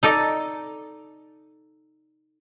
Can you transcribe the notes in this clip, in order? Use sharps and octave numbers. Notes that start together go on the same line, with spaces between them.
D#4 A4 D5 D#5